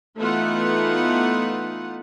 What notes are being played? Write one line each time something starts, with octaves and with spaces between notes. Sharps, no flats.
E3 A3 B3 D#4 F4 F#5